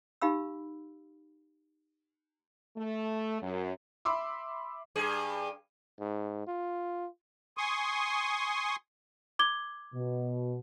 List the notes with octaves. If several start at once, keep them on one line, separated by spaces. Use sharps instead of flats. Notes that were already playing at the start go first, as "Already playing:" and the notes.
D#4 G4 F5 B5 E6
A3
F#2
E5 B5 C6 D6 E6
G2 G#4
G#2
F4
G#5 C6 C#6 D#6
D6 G#6 G7
B2